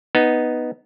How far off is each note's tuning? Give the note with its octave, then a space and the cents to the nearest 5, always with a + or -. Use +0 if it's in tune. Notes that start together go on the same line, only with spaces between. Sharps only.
B3 +0 D#4 +0